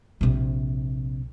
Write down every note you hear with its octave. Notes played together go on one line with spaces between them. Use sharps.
A#1 C3